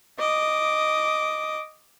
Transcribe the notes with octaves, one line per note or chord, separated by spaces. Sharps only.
D#5 D6